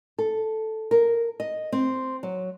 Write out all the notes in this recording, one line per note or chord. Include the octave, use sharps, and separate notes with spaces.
A4
A#4
D#5
C4
F#3